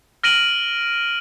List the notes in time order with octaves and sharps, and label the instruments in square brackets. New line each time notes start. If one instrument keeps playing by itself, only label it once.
[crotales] F6 A#6 D7 D#7 F#7